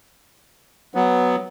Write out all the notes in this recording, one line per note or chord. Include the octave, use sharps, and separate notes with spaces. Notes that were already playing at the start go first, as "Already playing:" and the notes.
F#3 B3